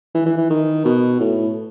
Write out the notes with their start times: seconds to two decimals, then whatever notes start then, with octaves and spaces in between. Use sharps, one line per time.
0.15 E3
0.26 E3
0.37 E3
0.50 D#3
0.85 B2
1.20 A2